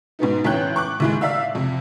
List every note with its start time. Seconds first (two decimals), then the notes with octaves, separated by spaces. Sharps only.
0.19 G#2 B2 B3 D#4
0.44 A1 E2 C#5 G5 F#6 G6
0.76 C#6 D6 F#6
1.00 D#2 A2 G#3
1.21 D5 E5 F5 E6
1.55 F2 C3